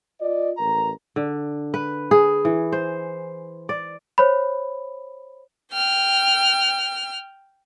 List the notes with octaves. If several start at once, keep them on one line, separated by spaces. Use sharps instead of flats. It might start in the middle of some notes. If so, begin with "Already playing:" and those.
F4 D5 D#5
A1 A#4 A#5
D3
B4
G#4
E3
C5
D5
C5 C#5 B5
G5 F6